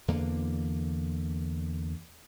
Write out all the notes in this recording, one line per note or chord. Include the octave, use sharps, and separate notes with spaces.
E2 D3 A#3